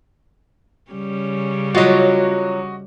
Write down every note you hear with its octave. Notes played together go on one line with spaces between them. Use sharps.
C#3 G3 C#4
F#3 F4 F#4 D#5